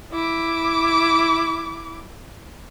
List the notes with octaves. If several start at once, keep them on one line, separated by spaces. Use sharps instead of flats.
E4 D6